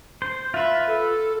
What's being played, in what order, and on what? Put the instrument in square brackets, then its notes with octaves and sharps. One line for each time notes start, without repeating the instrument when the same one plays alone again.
[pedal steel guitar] C5
[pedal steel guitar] F4 B4 [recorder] E5
[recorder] A4